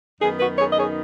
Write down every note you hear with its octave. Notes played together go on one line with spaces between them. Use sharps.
F#2 D#3 B3 D#4 G#4
F#4 B4
G#4 C#5
D#5
G#4 C#5